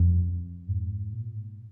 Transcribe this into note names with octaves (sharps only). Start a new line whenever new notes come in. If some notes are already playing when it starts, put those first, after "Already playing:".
Already playing: F2
G#2
A#2
G#2